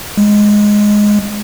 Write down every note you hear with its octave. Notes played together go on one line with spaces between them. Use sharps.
G#3